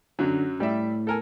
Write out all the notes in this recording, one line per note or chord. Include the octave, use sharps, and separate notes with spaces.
F#2 D3 F#3
A2 G3 D5 E5
A4 A#4 G#5